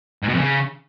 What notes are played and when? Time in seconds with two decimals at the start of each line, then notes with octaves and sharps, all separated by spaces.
0.23 G#2
0.28 B2
0.33 F2
0.38 C#3